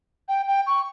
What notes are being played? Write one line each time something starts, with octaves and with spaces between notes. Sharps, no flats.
G5
G5
C#6